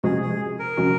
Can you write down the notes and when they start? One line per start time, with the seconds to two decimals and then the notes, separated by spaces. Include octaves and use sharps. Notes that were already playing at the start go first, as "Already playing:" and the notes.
0.04 C3 F3 G#3 C#4 F#4 G#4
0.22 G#4
0.59 A#4
0.77 C3 F3 G#3 C#4 F#4